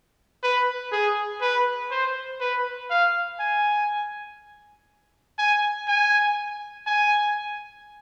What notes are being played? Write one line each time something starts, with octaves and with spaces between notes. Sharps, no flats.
B4
G#4
B4
C5
B4
F5
G#5
G#5
G#5
G#5